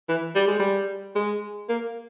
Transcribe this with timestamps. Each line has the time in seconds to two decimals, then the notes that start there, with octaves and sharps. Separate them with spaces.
0.09 E3
0.35 G3
0.48 G#3
0.60 G3
1.16 G#3
1.69 A#3